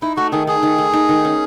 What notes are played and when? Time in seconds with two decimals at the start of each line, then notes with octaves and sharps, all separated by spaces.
0.02 D#4 E4
0.17 A3 F#4
0.32 D#3 G#4
0.47 A3 G#4
0.63 D#3
0.78 A3
0.93 D#4
1.09 D#3
1.25 C#4